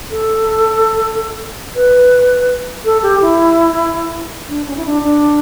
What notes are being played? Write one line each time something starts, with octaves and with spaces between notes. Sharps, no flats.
A4
B4
A4
G4
E4
D4
C#4
E4
D4
D4